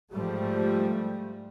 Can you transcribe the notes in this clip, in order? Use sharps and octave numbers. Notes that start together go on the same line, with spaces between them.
G#2 F3 G3 A3